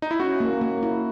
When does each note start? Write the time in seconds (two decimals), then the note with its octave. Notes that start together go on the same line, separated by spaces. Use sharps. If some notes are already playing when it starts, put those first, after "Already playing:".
0.02 D#4
0.11 E4
0.20 C#4 F#4
0.40 A#3
0.61 A#3
0.83 E4